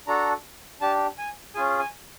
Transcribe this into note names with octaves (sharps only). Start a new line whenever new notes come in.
D4 F#4 A4 A#5
D4 G4 A5
G#5
C#4 F4 G#4 G#5
G#5